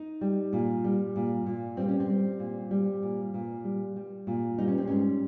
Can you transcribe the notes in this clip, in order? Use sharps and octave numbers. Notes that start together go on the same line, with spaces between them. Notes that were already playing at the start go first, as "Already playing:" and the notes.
Already playing: D#4
G3
A#2
G3
A#2
A#2
G3 C4
C#4
C4
G3
A#2
G3
A#2
A#2
G3
G3
A#2
G3 D#4
C#4
C4
G#2 C#4